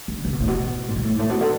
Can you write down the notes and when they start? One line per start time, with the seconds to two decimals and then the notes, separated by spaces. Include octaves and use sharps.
0.08 D3
0.25 C#3
0.33 B2
0.40 A2
0.48 B2
0.88 G#2
0.96 B2
1.04 A2
1.15 G#2
1.19 A2
1.29 B2
1.41 D3